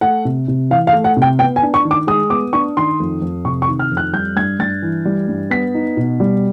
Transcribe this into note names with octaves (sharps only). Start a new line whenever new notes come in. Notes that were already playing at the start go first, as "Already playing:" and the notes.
A3 F#5
C3
C3
E3 F5
F5
A3
F#5
C3
G5
B3 G5
G#5
D4
C#6
D#3
D6
G#3 D#6
B3 D6
D4 C#6
D#3 C6
F2
F2
C3 C#6
C#6
D#3
F6
F2
F#6
G3 G6
G2 G#6
G2 A6
E3
G3
G2
B3 B6
D#4
B2
G3